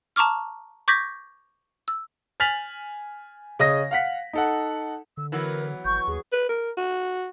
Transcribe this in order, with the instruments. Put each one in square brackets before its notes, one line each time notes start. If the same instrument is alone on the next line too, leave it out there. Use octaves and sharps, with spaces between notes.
[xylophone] A5 A#5 C#6 D6 F6
C#6 D6 G6 G#6 A#6 B6
E6
[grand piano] G#5 F6 A6 B6 F7 F#7
C#3 D#5 D#6 A#6
F5 F#5 B6
D#4 A4 F#5
[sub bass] D3 [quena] E6
[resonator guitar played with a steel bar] E3 F#3 B3 [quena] A#4
[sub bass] G#1 [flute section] C#6 [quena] G6
[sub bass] D#2 [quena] G#4
[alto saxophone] B4
A#4
F#4